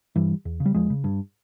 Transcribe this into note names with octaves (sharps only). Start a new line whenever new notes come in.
G2 E3 G3
E2
C#3
G3
E2 F3 G#3
C#3
G2